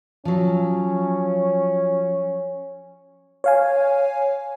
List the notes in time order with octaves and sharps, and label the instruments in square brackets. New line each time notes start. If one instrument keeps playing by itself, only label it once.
[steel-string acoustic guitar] F3 F#3 [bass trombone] C#4
[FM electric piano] C#5 F5 G#5